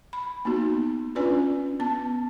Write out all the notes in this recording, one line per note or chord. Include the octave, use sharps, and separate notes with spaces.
B5
A#3 B3 D#4 F#4
C#4 D4 F4 B4 D5 G#5
B3 A5